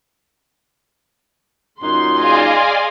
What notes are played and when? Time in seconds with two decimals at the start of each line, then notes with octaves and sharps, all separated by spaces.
1.82 F#2 A#2 D#4 C6
2.18 G#4 D5 D#5 F5 G#5